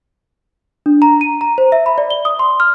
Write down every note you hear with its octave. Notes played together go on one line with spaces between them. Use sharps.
D4
A#5
D#7
A#5
C5
E5
B5
D5
G7
D#6
C6
F6